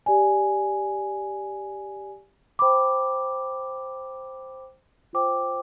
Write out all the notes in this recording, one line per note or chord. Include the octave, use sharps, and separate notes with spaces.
G4 D5 G#5
C5 G5 B5 D6
F4 C5 G5 D6